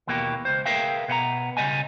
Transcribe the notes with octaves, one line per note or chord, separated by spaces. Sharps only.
D#2 B2 E3 A#3 G4
C#2 C5
G#4 A#4 B4 E5 F5 G5
B2 B3 F#5 A#5
C#3 E3 G3 D#5 G#5